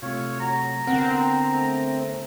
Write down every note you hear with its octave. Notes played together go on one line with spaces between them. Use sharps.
C3 A3 F4 C#5
F#3 A#5
D3 B3 C4 A#4 F#5
A3